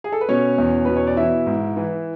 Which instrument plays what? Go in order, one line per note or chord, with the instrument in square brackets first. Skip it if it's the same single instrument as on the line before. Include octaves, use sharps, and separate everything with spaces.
[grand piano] G#4
A4
B4
B2 C#4 C#5
E2
B2 B4
C#5
D5
E3 E4 E5
G#2
E3